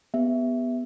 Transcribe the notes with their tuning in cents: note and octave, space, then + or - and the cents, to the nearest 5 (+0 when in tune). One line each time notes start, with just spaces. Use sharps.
B3 +0 G4 +45 E5 +0